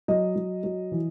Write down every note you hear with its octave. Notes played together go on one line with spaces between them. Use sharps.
F#3 D#5
F#3
F#3
E3